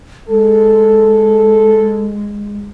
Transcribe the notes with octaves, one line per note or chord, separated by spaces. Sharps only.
G#3 A4